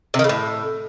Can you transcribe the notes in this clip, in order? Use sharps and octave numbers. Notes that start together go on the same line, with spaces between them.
C3
D#3
C#3
A2